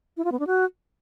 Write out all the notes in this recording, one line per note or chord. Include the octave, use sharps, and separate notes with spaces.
E4
F4
B3
D4
F#4